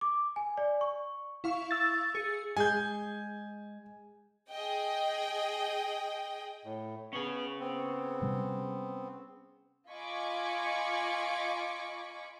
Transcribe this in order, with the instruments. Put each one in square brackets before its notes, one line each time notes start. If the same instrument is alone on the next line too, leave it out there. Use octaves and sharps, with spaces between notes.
[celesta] D6
G#5
D5
C#6
[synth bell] E4 F5 C#6
[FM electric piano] E6 A6
[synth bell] G#4 C#7
[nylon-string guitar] G#3 [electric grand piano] G#5 G6
[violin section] G#4 D#5 G5
[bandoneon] A2
[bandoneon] B3 [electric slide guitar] C#4 G#4
[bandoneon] B3 C4
[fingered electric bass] C3 G3
[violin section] F4 D#5 G#5 B5 C#6 D6